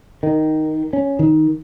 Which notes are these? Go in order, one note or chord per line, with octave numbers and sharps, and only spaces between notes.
D#3
C#4
D#3